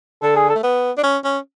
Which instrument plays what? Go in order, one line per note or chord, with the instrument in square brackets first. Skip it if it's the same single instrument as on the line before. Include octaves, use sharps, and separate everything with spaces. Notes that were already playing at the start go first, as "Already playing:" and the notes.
[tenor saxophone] D3 [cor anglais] A4
[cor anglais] G#4
A4
[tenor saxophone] A3
B3
D4
C#4
C#4